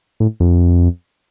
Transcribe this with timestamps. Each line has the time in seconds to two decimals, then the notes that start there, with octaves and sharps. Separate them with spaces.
0.20 A2
0.40 F2